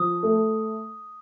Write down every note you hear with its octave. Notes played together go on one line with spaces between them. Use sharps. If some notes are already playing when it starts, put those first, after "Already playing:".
Already playing: F3 D#6
A3